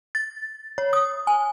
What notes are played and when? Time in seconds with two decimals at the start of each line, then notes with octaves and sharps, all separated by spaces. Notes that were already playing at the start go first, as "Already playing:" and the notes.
0.15 A6
0.78 C#5
0.93 D#6
1.27 G#5